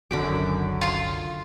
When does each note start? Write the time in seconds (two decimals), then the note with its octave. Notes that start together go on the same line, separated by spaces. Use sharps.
0.11 F#1 C2 F#2 D3 D#3 B5 D6
0.81 F4 C6